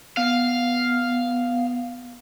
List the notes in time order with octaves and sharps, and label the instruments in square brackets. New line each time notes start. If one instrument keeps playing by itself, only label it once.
[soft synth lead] B3 [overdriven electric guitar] F5